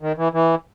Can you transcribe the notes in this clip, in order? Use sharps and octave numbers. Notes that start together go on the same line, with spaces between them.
D#3
E3
E3